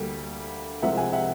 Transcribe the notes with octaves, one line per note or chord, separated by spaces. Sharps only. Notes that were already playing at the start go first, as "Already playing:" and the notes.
Already playing: D2 D3 G3 A#3
C2 C3 F3 G#3 E5 F#5
F#5 G#5
E5 F#5